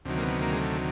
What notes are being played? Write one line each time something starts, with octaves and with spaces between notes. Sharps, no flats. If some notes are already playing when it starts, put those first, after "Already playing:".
D2 C3 D#3 F#3
A#3
B3
A#3
G#3
A3